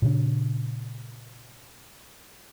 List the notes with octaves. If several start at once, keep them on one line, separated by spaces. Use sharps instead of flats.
A#2 C#3 D4